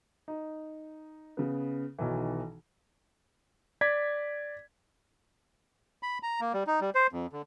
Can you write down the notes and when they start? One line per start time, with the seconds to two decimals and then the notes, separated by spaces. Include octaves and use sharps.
0.28 D#4
1.37 C#3 B3
1.99 B1 B2 D#3 E3
3.81 D5 G#6 B6
6.03 B5
6.23 A#5
6.40 A#3
6.54 G3
6.67 D#4
6.81 G3
6.95 C5
7.13 F2
7.33 D3